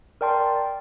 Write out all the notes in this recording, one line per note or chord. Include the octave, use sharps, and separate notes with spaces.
A#4 D5 G5 A5 C6